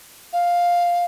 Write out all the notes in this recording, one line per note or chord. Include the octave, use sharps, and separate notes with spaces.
F5